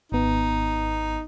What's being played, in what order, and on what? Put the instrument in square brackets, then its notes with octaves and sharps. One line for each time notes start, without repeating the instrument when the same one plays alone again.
[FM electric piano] G#1 B3 [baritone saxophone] D#4